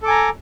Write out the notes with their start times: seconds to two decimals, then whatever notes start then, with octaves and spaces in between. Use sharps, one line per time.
0.02 A4
0.05 D6
0.08 G#5
0.10 A#5